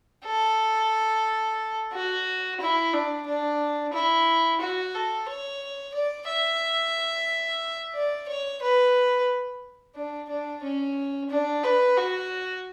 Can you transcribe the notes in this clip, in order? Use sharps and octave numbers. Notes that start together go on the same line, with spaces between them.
A4
F#4
E4
D4
D4
E4
F#4
A4
C#5
D5
E5
D5
C#5
B4
D4
D4
C#4
D4
B4
F#4